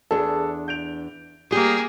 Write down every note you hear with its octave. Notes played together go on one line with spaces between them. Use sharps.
E2 D4 G#4 A4
G6 D7 F7
G3 A#3 G4 G#4